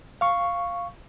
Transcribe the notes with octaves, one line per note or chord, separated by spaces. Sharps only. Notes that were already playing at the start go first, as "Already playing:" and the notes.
F5 C#6